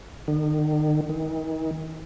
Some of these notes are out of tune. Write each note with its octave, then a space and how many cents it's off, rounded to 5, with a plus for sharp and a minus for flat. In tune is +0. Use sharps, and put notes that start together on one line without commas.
D#3 -40
D#3 +35